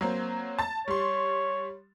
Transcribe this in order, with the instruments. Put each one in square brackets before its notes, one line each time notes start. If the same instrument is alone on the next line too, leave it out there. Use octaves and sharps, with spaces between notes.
[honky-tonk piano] F#3 A#3 C4
A5 A6
[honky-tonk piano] G3 C6 [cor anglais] C#5